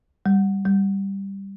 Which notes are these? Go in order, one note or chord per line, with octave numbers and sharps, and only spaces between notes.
G3
G3